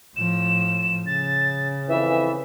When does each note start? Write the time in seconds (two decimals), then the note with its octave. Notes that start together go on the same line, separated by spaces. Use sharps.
0.16 A2 F3 E7
1.06 C#3 A6
1.88 F2 E3 E5